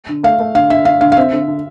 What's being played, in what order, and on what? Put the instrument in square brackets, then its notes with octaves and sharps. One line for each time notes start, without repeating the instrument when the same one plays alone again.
[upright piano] D3
[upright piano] A3 [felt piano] F5
[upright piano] A3
[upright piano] D3 [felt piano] F5
[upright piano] D3 [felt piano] E5
[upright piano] D3 [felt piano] F5
[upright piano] D3 [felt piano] F5
[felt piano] F5
[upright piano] C4 [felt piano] E5
[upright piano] D3
D3